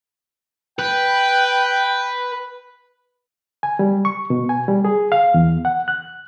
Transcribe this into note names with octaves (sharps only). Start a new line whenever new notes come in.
B4 G5
G#5
G3
C#6
B2
G#5
G3
G#4
F5
E2
F#5
F#6